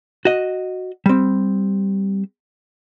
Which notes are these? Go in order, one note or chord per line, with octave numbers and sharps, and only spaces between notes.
F#4 D#5
G3 C4